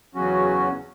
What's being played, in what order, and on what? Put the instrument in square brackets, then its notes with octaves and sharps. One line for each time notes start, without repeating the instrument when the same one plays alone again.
[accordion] E2 C#3 F#3 C#4 F#4